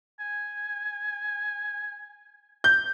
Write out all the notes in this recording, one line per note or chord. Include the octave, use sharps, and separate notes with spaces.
G#5
G6